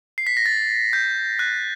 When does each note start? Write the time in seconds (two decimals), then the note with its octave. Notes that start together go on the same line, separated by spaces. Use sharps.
0.18 C7
0.27 B6
0.37 A#6
0.46 A6
0.93 G6
1.39 F#6